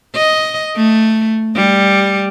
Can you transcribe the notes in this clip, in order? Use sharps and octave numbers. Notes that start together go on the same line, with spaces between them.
D#5
A3
G3